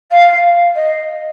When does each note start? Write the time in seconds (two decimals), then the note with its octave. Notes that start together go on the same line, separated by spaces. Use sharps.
0.11 F5
0.75 D#5